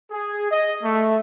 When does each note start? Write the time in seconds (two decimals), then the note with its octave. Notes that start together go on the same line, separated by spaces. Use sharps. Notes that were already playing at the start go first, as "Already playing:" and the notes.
0.11 G#4
0.51 D#5
0.83 A3